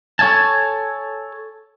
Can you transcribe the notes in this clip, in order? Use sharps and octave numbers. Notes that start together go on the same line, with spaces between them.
A4 C#5 E5 G#5 A5